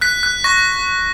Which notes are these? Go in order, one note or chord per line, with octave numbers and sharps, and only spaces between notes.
F#6 B6
F#6
C#6 A#6